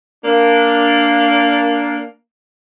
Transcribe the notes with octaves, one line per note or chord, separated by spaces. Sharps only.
A#3 D4